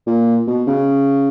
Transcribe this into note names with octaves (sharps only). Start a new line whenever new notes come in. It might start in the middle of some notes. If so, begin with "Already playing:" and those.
A#2
B2
C#3